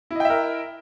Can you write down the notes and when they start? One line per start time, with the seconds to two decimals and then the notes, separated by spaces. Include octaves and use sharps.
0.11 E4
0.15 D#5
0.20 G5
0.25 E5
0.30 A#4